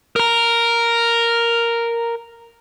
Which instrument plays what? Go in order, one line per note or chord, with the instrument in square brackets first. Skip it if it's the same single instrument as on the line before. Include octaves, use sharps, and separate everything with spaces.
[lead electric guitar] A#4 A#5